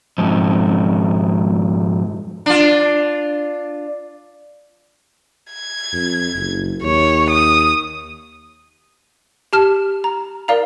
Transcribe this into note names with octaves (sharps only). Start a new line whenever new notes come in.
F2 G#2
D4 F4
G#6
F2
F#1
D#2 C#5
D#6
G4 A5 F6 E7
A#5
A#4 D5 F5 A#5